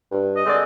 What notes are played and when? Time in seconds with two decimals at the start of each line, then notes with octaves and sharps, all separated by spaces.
0.12 G2
0.35 D#5
0.45 D3 G#3 C4 D5